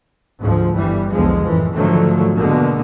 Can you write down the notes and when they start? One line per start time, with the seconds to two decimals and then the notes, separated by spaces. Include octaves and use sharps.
0.41 D2 G#2 F3
0.74 G1 E3 G3
1.13 B1 E2 D3 F3 G#3
1.43 F#2 A2 E3 F3
1.75 G#2 D3 D#3 F3 F#3 A3
2.36 B2 D3 G#3 A#3